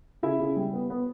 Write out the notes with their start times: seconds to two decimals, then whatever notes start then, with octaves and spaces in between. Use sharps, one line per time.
0.23 C#3 E4 E5
0.40 C#3
0.57 G3
0.74 B3
0.90 B3